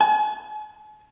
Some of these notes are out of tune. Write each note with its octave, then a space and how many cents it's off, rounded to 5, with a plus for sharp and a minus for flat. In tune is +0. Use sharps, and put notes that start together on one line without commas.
G#5 +45